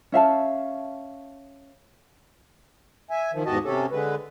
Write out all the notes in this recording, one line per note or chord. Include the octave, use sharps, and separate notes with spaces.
C#4 E5 F5 A5
E5 G#5
D#3 F3
E2 G#2 F#4 G4 D#5 A5
C3 C#4 G4 A4
D3 G#3 B4